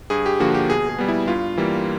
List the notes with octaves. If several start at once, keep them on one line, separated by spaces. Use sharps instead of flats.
G2 G#4
G4
D3 F3 A#3 F#4
G4
B2 G#4
G#4
G3 B3
E4
G2 F4
E3 G3 A#3